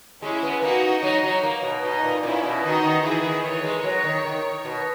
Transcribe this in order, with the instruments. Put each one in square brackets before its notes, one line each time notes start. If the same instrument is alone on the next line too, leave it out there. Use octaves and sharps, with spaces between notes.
[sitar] G#3 [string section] C#4 E4
[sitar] B3
[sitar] A#3 [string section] D#4 F#4
[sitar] F#3 [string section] D#4
[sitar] F#3
A#3
B2
[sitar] B2 [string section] D#4
[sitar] A#2
[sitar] A#2 [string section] C#4 E4
[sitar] B2
[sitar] D#3 [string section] D#4 F#4
[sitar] D#3
[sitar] E3 [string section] E4 G#4
[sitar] D#3
[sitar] E3 [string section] A#4 C#5
[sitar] G#3
F#3
D#3
D#3
B2